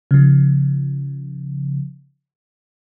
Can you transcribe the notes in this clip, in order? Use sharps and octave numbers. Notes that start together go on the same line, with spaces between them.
C#3 F3